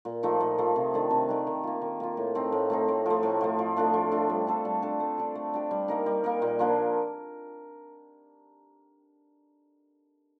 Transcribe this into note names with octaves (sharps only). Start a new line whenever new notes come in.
A#2
F3 A3 D#4
A#2
F3 A3 D#4
C3
D#3 A3 D4
C3
D#3 A3 D4
D#3
A#3 F4
D#3
A#3 F4
A2
A3 C4 D#4
A2
A3 C4 D#4
A2
F3 A3
A2
F3 A3
F3
A3 D4 F4
F3
A3 D4 F4
G3
D4 A4 C5
G3
D4 A4 C5
A3
D4 G4
A3
D4 G4
G3
A#3 D#4 A#4
G3
A#3 D#4 A#4
A#2
F3 A#3 D4